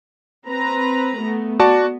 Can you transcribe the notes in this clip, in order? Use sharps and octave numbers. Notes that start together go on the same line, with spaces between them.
C4 B4 A#5
A3 B3
B3 F#4 D5 A5